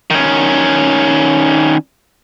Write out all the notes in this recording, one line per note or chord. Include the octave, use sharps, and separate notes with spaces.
D#3 C#4